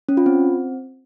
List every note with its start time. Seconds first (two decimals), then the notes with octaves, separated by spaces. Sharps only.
0.09 C#4
0.17 F4
0.26 C4